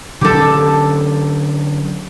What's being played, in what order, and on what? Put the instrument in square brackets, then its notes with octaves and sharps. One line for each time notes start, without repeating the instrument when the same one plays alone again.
[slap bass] D3 F#3 C#4 [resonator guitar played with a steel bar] G4 A4